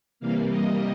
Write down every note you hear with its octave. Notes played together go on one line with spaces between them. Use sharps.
C3 E3 G3 A#3 F5
D#5